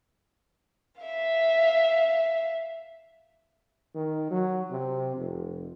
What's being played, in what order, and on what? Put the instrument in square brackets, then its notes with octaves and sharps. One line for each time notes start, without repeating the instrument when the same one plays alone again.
[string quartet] E5 F5
[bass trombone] D#3
F#3
C3
F1